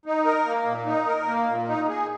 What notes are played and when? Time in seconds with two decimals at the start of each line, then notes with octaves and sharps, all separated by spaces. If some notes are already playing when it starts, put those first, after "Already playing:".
0.06 D#4
0.25 A#4
0.46 A#3
0.66 A#2
0.86 D#4
1.07 A#4
1.27 A#3
1.47 A#2
1.68 D#4
1.88 G#4